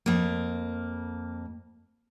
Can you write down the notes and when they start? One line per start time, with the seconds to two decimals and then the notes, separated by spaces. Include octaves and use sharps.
0.06 F2 A#3